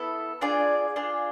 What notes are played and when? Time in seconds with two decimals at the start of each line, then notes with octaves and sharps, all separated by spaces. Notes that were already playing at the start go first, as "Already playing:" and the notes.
Already playing: B3 E4 A4
0.41 D4 F4 G#4 D5
0.96 D4 F4 G#4